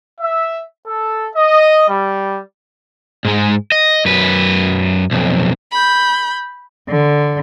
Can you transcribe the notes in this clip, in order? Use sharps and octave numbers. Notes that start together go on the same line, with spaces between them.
E5
A4
D#5
G3
G#2 G#3
D#5
F#2 B4
B1 F2
B5 G6
D3